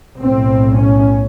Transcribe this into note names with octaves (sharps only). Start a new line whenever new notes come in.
B1 A2 C4
C#4